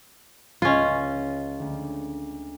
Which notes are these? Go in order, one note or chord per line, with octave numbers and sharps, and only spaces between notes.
C#2 C#4 F4
D2